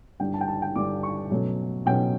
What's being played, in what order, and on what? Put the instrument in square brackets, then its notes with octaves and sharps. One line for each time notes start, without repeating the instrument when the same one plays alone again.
[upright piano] G2 D3 G3 D4 G5
A5
G5
A5
G5
G2 D3 G3 D4 D6
C#6
B2 F#3 A3 C#4
B2 F#3 A3 C#4 G5